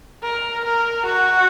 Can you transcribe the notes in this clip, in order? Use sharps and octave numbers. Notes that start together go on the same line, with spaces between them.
A#4
A#4
F#4